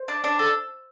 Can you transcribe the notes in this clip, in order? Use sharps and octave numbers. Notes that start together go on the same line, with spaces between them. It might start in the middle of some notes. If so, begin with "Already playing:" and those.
Already playing: C5
D4
D4
A4